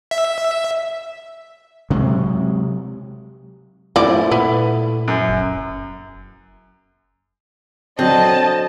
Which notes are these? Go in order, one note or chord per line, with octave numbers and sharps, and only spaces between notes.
E5
C3 F#3 G#3
E3 A3 C4 E4 F4 D5
A#2 B3
F#2
F#1
D3 F#3 C4 D#5 A5